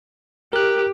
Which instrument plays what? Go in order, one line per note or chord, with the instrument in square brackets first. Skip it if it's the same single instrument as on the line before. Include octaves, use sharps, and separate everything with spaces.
[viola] G4 [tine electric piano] A#4 F#6